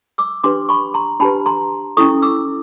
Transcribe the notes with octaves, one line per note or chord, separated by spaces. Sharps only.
D6 E6
D4 G4 B4 C6 D6
B5 C#6
A#5 C6
D4 G4 B4 A5 B5
A#5 C6
C#4 E4 A4 C#6 D#6
D6 E6